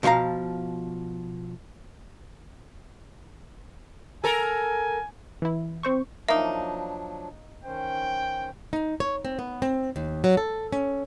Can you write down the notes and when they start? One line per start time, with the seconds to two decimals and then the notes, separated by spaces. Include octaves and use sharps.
0.03 B2 F3 C#5 F5 A#5
4.24 A4 A#4 G#5
5.42 E3 E4
5.83 C4 C5 C#6
6.29 F3 F#3 A#3 D4 D#4 E5
7.65 D#3 C#4 C5 G5
8.73 D#4
9.00 C#5
9.25 C4
9.39 B3
9.62 C4
9.96 D#2
10.24 F#3
10.37 A4
10.73 C#4